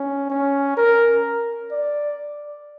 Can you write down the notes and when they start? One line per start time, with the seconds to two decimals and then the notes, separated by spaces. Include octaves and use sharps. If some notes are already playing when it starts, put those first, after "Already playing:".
Already playing: C#4
0.30 C#4
0.77 A#4
1.71 D5